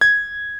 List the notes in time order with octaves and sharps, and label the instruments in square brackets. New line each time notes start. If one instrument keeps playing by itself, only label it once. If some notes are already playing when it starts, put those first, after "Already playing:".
[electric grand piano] G#6